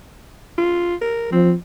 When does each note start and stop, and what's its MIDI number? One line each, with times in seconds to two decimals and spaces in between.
0.58 0.95 65
1.02 1.28 70
1.32 1.54 53
1.32 1.52 60